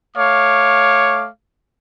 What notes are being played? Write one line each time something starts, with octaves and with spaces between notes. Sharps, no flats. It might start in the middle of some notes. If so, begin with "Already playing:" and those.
A3 C#5 F5 D6